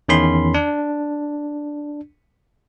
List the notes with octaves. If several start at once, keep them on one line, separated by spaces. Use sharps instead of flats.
E2 D#3 C#4 B5 C6
D4